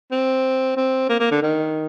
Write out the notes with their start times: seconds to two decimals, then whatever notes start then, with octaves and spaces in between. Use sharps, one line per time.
0.12 C4
0.77 C4
1.10 A#3
1.20 A#3
1.31 D3
1.42 D#3